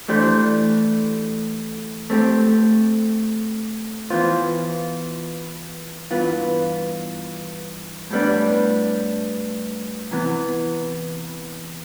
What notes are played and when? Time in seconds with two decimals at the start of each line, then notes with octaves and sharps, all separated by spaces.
0.08 E3 A3 D4 G4 C5
2.10 A3 C4 G4
4.10 E3 B3 F4 C5
6.11 G2 E3 B3 F4
8.11 A2 G3 B3 D4
10.11 C3 E3 B3